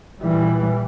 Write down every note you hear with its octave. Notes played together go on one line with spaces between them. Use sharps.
A#2 E3 G3